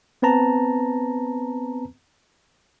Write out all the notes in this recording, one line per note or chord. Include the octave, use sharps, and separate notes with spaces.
B3 C4 B4 A5 A#5